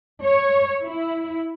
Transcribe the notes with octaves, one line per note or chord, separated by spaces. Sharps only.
C#5
E4